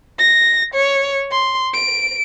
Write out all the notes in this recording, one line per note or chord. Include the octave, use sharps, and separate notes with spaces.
A#6
C#5
C6
D7